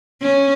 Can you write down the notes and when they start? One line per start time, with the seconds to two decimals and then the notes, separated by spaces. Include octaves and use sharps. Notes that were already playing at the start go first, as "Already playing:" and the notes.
0.22 C#4